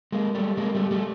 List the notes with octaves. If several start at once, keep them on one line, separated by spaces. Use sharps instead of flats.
G#3 A#3
G3 A3
G#3 A#3
G3 A3
G3 A3